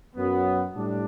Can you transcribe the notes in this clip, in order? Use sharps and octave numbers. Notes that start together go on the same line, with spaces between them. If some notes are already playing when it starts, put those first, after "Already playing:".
F#2 F#3 B3
A2 G3 D4